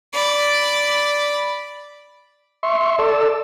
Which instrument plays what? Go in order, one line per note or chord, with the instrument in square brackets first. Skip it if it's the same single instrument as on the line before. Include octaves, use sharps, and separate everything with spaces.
[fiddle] D5 B5
[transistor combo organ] E5 C6 C#6
A4 D5 E6